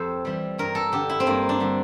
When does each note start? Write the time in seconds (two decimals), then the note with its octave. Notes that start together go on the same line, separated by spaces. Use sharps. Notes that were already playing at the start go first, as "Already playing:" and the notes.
Already playing: F2 G4 A4 C5
0.25 E3 G3
0.58 G2 A#4
0.75 A4
0.92 D3 G3 G4
1.09 E4
1.20 C4
1.26 G2 A#3
1.49 D4
1.60 D3 G3